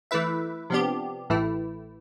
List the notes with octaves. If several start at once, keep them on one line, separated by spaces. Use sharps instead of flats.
E3 A3 E4 B4 E5
C3 F3 B3 D4 G4
A1 A2 E3 A3 E4